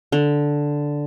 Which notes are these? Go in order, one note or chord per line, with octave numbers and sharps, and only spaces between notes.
D3